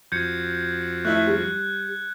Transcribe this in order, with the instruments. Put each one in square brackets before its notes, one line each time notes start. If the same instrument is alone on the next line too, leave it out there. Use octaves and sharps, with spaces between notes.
[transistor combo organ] F2 F3 F#4 [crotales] G6 G#6 C#7
[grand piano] A3 E4 E5 [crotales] F#6
[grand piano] G3